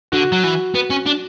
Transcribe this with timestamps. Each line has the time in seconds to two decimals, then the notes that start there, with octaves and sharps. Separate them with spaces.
0.12 D3 F#4
0.32 F#3
0.44 E3
0.75 B3
0.90 C#4
1.06 D4